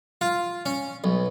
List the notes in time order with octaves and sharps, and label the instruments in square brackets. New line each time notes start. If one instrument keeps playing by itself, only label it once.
[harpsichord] F4
C#4
B1